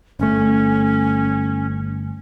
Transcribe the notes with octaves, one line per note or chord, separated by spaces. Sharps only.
G1 A3 C#4